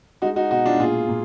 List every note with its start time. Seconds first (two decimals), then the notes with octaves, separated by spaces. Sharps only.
0.22 G#3 D#4 F#4
0.36 D#4 F#4
0.51 B2 D#4 F#4
0.66 D4 F4
0.80 A#2 F4 G#4
1.09 A#2